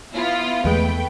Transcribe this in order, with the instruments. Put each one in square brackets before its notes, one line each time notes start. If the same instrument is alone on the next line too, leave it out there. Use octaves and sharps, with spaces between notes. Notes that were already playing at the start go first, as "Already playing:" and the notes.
[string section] B3 E4 F4
[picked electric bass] E2 G#3 [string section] A3 B4 G5